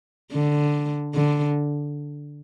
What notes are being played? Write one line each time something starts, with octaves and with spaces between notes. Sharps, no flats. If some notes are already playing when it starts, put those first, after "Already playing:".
D3
D3